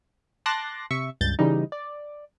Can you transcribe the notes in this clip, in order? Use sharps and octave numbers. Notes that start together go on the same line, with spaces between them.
A5 C6 D6 F#6 A6 A#6
C3 E5 C#6
C#2 G2 G6 A6
C#3 E3 G3 D#4
D5